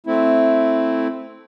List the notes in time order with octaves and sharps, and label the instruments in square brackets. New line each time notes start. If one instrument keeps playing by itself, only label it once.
[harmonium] A3 C4 E4